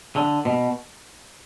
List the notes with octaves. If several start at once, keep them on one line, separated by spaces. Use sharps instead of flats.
D3
B2